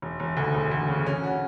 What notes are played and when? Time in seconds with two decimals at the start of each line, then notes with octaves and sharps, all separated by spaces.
0.02 E1
0.20 E1
0.37 D2
0.55 E1
0.71 D2
0.88 C#3
1.06 C#4
1.23 F#4